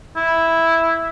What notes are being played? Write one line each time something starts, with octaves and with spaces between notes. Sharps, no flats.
E4